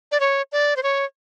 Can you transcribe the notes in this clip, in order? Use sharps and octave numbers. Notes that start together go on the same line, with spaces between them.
D5
C#5
D5
C5
C#5